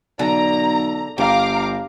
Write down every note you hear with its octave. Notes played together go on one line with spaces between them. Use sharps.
B1 D3 A#5
G1 G4 F5 A#5 D6